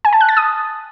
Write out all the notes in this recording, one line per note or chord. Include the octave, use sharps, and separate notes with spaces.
G#5
A5
F#6
A6
D#6